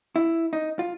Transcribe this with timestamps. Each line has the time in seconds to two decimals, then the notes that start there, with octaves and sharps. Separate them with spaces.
0.16 E4
0.53 D#4
0.79 F4